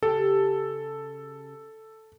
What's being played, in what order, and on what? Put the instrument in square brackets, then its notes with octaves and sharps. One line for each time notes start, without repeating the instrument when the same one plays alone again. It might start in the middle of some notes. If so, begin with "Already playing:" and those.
[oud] C#3 G4 [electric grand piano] A4